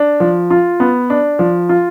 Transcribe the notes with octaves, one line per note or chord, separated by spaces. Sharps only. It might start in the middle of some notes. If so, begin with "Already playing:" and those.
Already playing: D4
F3
F4
B3
D4
F3
F4